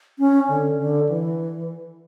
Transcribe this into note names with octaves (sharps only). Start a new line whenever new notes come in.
C#4
D3
D3
E3